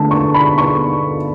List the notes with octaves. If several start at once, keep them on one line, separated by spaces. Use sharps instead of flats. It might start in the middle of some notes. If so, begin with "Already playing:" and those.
Already playing: D3 A3 A5
C#6
B5
C#6